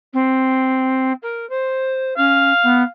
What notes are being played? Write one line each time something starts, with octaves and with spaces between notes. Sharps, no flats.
C4
A#4
C5
C#4 F5
B3